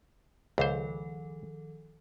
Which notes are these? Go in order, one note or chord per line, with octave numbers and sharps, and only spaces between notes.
C#2 D#3 F3 A4 C5